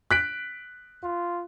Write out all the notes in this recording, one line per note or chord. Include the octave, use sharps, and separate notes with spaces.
F#6 B6 D7
F4